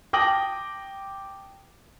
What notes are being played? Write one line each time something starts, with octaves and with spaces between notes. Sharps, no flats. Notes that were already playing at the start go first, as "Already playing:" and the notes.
G5 A5 D6 D#6 A#6 F#7